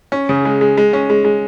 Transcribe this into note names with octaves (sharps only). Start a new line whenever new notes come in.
C#4
C#3
G#3
G#3
G#3
C#4
G#3
G#3